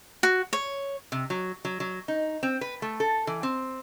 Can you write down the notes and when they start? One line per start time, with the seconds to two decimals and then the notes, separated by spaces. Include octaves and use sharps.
0.23 F#4
0.53 C#5
1.12 C3
1.30 F#3
1.65 F#3
1.80 F#3
2.08 D#4
2.43 C4
2.61 B4
2.82 A3
3.00 A4
3.27 E3
3.43 C4